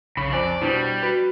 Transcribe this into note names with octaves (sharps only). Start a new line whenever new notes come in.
B1 C#3 B5 C#6
F2 C5 D5 G#5 F#6
B2 G3 D4 E4
F#4 B4